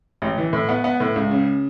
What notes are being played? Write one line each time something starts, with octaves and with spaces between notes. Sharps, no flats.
A1
E3
A2
B3
B3
A2
C#2
C#3